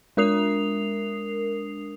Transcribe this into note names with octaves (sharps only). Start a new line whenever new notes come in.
G#3 D4 A#4 D#6 C7 F7